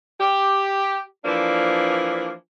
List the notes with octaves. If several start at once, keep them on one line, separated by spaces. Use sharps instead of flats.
G4
E3 F3 A#3 D4